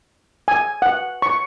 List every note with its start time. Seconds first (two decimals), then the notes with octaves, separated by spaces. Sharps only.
0.48 G#5
0.82 F#5
1.22 C#6